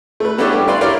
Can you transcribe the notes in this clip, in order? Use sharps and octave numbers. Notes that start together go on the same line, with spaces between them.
A3 B4
B3 C#4 D4 E4 G4 A4
G2
E4 B4 D5 F5 C6
E4 G4 A#4 C#5 D5 F5